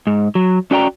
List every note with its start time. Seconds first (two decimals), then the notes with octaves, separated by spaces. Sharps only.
0.07 G#2
0.35 F#3
0.71 C#4 F#4 D5 G5 A5 A#5